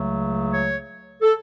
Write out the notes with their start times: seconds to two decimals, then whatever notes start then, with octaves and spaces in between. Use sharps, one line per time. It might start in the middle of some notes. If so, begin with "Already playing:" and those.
Already playing: C#2 C#3 F#3 A3
0.52 C#5
1.22 A4